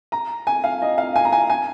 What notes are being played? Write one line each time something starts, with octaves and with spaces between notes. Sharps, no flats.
A#5
G#5
F5
D#5
F5
G#5
A#5
G#5
G#5